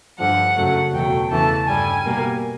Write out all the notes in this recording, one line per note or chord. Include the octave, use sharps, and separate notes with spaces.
G2 D3 F3 F#5
F#2 C#3 F#3 A3
E2 B2 F#3 A3 G5
E2 C#3 E3 A3 A5
G2 D3 G3 G#5
B2 G3 A#3